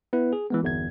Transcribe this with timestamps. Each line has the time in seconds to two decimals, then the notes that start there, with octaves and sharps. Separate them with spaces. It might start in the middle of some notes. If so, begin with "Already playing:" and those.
0.13 B3 E4 B4
0.33 G#4
0.50 E3 G#3 B3
0.63 G1 E2 G#6